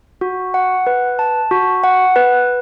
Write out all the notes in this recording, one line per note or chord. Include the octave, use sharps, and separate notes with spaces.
F#4
F#5
B4
A5
F#4
F#5
B4